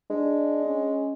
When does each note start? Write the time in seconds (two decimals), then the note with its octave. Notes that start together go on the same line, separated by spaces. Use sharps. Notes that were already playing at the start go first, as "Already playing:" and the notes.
0.10 G#3 D4
0.67 C#4